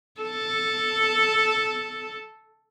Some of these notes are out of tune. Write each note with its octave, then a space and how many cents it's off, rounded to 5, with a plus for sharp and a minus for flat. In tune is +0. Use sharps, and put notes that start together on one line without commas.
A4 +0